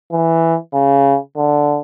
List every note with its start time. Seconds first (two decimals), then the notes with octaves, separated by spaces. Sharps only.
0.12 E3
0.73 C#3
1.37 D3